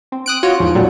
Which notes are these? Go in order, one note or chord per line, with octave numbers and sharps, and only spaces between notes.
C4
D#6 F#6 D7
F4 F#4 C#5 D#5
E2 G#2 F3
A#2 F#3 G3 A4